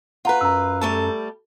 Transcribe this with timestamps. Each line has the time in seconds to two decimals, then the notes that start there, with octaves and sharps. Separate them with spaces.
0.25 F4 B4 F#5 A#5
0.41 F#2 A#5 E6
0.81 G3 A3 A5